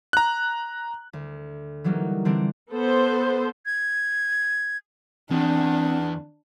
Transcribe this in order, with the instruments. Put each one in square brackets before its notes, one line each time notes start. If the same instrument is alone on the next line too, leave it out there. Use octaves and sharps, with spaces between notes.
[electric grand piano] A#5 F#6
[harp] D2
E3 F#3 G3 A#3 D#4
D3 E3 G3 C4 D4
[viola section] B3 A4 C5
[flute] G#6
[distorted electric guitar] E2 [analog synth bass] C4 [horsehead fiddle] D4